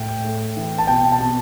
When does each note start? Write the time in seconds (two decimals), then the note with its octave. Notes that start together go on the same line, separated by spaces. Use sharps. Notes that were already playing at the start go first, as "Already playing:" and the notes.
Already playing: A2 G5
0.24 A3
0.57 E3
0.78 A5
0.87 B2 G5
1.12 A5
1.20 B2